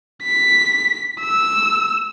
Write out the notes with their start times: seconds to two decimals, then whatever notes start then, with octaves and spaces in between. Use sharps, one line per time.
0.24 B6
1.21 E6